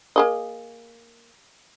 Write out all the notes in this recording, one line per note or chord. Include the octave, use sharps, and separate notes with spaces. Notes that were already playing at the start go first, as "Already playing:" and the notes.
A#3 G#4 D#5